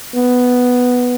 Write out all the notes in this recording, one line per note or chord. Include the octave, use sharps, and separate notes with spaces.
B3